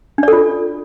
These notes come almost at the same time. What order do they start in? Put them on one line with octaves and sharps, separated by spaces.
D4 D5 A4 F4